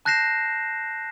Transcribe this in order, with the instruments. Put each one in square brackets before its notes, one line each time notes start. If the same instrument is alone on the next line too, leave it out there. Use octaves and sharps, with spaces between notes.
[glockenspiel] A5 F#6 G6 A#6 C7 E7